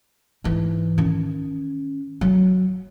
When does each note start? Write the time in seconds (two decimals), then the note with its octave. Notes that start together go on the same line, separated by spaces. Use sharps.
0.44 G#2 E3
0.98 D#3 C#4
2.21 F#3